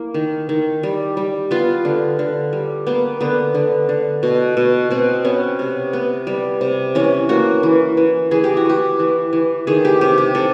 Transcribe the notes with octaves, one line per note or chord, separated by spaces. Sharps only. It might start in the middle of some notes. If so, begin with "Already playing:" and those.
Already playing: A#3 E4
D#3
D#3
G3
G3
B3 F4
D3
D3
G3
A#3 B3
D3 B3
D3
D3
B2
B2
B2 C4
B3 C#4
C3
B3
G3
C3
E3 C#4
A#3 F#4
E3
E3
E3 G#4
G4
F#4
E3 G4
E3
E3
D#3 G#4
G4
C3 G4
G4
C3 A4